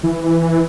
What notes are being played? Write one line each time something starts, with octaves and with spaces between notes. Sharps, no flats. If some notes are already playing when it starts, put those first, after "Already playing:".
E3